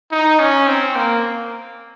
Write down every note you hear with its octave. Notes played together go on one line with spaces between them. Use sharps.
D#4
C#4
C4
A#3